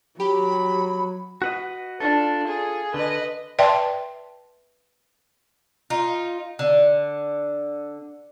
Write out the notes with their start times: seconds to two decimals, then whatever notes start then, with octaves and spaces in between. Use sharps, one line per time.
0.20 F#3 G4 B5
1.42 F#4 B4 D#5
2.00 D4 F4 A4
2.48 G#4
2.94 D3 B4 D#5
3.59 B4 D5 E5 G5 A5 C6
5.90 D#4 F4
6.59 D3